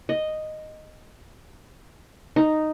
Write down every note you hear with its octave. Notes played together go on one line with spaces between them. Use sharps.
D#5
D#4